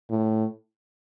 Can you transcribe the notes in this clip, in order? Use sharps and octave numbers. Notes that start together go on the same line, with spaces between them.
A2